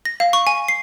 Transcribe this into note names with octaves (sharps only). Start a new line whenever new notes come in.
A#6
F5
C#6
G#5
C7